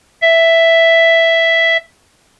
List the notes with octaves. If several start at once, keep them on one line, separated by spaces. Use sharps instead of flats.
E5